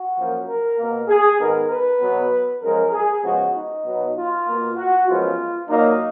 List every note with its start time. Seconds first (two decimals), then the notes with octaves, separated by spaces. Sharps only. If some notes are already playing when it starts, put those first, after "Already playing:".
Already playing: F#4
0.17 F#2 F3 A#3
0.47 A#4
0.78 B2 A#3
1.08 G#4
1.38 G#2 D#3 G#3 B3 A#4
1.70 B4
2.00 B2 F#3 B3
2.62 F#2 F3 G#3 A#4
2.92 G#4
3.23 C#3 F3 G#3 B3 F#4
3.54 D#4
3.84 B2 F#3 B3
4.15 F4
4.47 B2 A#3
4.77 F#4
5.07 F#2 F3 G#3 B3 F4
5.69 A#2 F#3 A#3 D#4